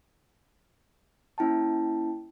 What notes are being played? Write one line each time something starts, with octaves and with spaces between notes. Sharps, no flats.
A#3 C#4 E4 G5 A5